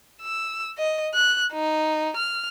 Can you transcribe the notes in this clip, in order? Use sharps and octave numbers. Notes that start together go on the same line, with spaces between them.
E6
D#5
F#6
D#4
F6